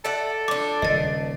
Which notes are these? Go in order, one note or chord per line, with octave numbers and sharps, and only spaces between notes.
A4 D5 E5 F#5
F3 D4 D6
D#1 C#3 D#5 A6